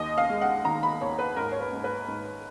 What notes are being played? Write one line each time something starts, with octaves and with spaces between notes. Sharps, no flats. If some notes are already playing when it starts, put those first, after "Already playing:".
Already playing: D#2 D#5
F5
G#3
F#5
D#3 A#5
B5
D#2 C#5
B4
G#2 A#4
C#5
B4
G#2
B4
G#2